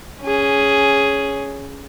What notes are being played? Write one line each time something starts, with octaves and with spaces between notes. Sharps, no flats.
C#4 G#4